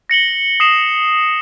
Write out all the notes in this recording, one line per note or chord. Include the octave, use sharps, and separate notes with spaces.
A#6 C#7 F#7 G7
D#6 C7 E7